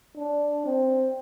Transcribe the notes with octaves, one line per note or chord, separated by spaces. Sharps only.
D4
C4